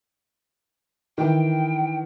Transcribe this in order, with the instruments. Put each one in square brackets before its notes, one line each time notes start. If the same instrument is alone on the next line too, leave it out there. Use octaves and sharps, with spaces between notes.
[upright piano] D#3 E3 [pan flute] G5